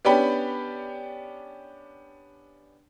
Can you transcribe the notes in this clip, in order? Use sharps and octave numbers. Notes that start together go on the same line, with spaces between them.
B3 C#4 D4 G4 G5 B5